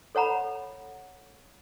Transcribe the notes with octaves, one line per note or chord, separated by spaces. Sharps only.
A4 C#5 F#5 A#5 B5